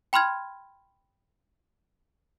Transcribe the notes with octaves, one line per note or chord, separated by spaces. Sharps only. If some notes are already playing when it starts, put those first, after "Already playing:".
G5 B5 C6 F6 G#6